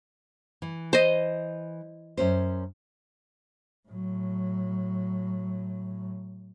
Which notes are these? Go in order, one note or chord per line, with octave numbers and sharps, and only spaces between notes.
E3
C5 D#5
F#2 C#4 C5
A2 F#3